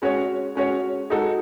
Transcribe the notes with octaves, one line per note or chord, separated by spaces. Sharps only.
G#3 C#4 F#4 C#5
G#3 C#4 F#4 C#5
G#3 D#4 F#4 A4